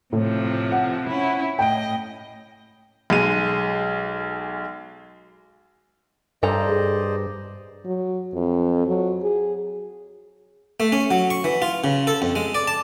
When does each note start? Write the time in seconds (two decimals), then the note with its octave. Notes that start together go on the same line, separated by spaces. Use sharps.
0.13 A2 C3 F3
0.72 F#5
1.06 C#4 E4
1.59 A2 D#5 G5 D7
3.10 B1 G#3 D#7
6.43 G2 A4 C5 D5 D#5 A#5
6.69 G#4
7.85 F#3
8.33 F2
8.87 F#3
9.23 G#4
10.80 A3
10.92 C#4
11.11 F#3
11.30 C#6
11.44 E3
11.62 F4
11.84 C#3
12.07 A4
12.22 F2
12.36 G#3
12.55 D5
12.68 A5